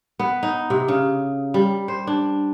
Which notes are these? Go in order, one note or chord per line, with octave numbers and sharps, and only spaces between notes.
B3
D#4
C3
C#3
G3
C5
D4